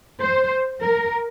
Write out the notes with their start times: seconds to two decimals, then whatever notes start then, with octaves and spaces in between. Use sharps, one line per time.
0.20 C5
0.81 A#4